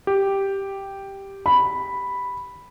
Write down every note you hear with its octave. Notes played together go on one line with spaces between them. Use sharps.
G4
B5